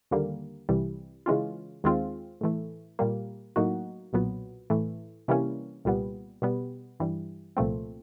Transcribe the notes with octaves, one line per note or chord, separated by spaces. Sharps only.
D#2 D3 G3 A#3
C2 C3 E3 G3
C#3 E3 G#3 C#4 F4
D#2 D#3 G#3 C4 F4
A2 E3 A3
A#2 G3 A#3
A2 F#3 A#3 D#4 F#4
B1 A#2 F#3 B3
A2 E3 A3
C3 E3 G3 A#3 C#4
C2 A#2 G3 B3
B2 G3 B3
G2 E3 G3
C2 A#2 F3 A3 C4